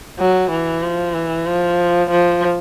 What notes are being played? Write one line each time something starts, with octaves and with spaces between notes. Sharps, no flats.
F#3
E3
F3
E3
F3
F3